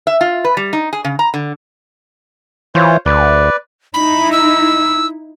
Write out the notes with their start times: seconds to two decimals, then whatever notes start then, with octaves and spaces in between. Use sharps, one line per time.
0.07 E5
0.21 F4
0.44 B4
0.57 G3
0.73 D#4
0.93 G#4
1.05 C#3
1.19 A#5
1.34 D3
2.75 E3 F4 C5 C#5
3.06 D2 B4 D5
3.94 D#4 E4 B5
4.32 E6